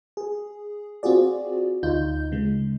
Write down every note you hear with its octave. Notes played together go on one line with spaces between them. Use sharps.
G#4
C4 F4 F#4 G#4 D5
D2 D#4 F4 G6
C#3 G#3